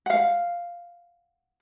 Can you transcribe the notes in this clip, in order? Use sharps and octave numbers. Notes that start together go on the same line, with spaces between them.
F5 F#5